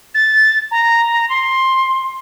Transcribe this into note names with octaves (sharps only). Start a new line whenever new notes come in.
A6
A#5
C6